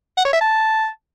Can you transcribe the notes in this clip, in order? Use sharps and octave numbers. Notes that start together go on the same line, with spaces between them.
F#5
C#5
E5
A5